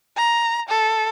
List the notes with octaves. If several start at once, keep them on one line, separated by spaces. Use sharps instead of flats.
A#5
A4